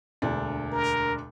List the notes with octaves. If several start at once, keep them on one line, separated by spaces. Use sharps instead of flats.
E1 D2 D4
A#4